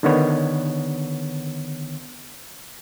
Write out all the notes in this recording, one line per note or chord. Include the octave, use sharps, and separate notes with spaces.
D3 D#3 B3 C#5